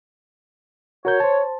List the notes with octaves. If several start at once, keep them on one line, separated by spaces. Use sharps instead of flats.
F#4 A#4 C#5 G6
C5 A5